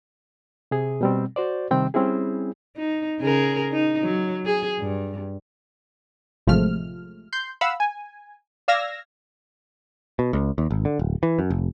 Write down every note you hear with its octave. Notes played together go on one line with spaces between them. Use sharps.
C3 G#4
B2 G3 C4
F#4 C5 D5
C3 D#3 G3 C4 G5
G3 C4 C#4 E4 G#4
D#4
C#3 G#4 A#4
D#4
F#3
G#4
G2
A1 C3 F3 G#3 A3 F6
C6 G6
F5 F#5 B5 E6
G#5
D5 F5 E6 F6 G#6 A#6
B2
C#2
D#2
G#1
D3
D1
E3
F#2
F1